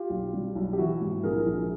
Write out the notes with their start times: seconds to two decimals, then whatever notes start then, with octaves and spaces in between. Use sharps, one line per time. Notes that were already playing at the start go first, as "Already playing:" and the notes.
Already playing: F4 G4
0.10 B1
0.33 G3
0.55 B1
0.73 G4
0.78 E3 E4 F#4
1.01 G#2
1.23 A#1 G#4 A#4
1.46 A#1